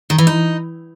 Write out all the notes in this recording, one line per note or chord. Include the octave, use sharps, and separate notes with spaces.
D#3
E3
D#4